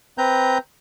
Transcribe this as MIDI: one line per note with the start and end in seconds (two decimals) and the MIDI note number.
0.18 0.58 60
0.18 0.58 71
0.18 0.58 82
0.18 0.58 91